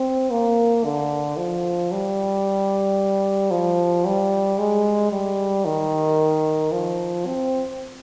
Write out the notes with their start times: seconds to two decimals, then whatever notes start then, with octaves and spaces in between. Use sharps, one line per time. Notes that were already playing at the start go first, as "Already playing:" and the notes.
Already playing: C4
0.31 A#3
0.84 D3
1.37 F3
1.92 G3
3.51 F3
4.05 G3
4.58 G#3
5.12 G3
5.65 D#3
6.72 F3
7.26 C4